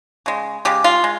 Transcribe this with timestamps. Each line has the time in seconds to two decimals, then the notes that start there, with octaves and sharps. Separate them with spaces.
0.26 C#3 G#3
0.65 C#3 G#3 G4
0.84 F4
1.04 G#3